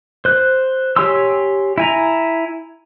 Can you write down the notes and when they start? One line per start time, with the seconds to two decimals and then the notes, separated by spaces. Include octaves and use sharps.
0.25 C5 F#6
0.96 G4 C#5 G#5 C6 E6
1.78 E4 G#5 A#5